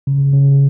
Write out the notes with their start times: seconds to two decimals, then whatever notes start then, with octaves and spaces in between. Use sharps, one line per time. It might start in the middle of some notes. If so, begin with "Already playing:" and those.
0.07 C#3
0.33 C#3